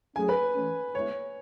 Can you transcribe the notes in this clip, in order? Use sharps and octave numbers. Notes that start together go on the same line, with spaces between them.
F#3 A3 C#4 G#4 G#5
B4
E3 A3 C#4
D2 D3 G#3 B3 E4 C#5